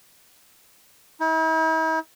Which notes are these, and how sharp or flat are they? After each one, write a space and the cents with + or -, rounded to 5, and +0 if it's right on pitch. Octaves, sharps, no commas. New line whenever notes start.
E4 -45